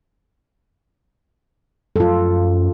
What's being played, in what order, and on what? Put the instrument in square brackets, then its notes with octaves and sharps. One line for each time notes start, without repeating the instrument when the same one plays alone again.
[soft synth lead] F#2 [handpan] F4 A4